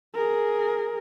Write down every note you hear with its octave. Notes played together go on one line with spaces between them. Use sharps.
G#4 A#4